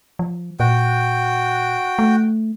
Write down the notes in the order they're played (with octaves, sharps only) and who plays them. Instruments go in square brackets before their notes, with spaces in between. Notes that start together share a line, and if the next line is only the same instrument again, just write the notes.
[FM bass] F3
[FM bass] A#2 [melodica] F#4 G5
[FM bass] A3